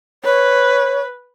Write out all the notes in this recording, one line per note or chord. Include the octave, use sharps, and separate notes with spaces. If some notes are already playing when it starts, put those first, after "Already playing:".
B4 C#5